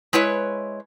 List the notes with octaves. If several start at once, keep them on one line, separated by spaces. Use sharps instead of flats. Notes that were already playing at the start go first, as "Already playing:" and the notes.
G#3 E4 B4 C#5